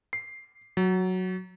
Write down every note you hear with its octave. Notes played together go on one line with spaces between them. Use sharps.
C7
F#3